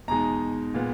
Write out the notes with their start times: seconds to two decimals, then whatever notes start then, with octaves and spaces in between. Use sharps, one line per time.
0.08 E2 B2 G#3 D#4 A#5
0.74 A#2 G#3 B3